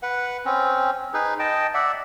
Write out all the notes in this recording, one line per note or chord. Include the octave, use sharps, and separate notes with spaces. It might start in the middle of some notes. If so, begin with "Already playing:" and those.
B4 F#5
C4 C#4
D#4 G#4 B4
D#5 G5 A5
D5 E5 F#5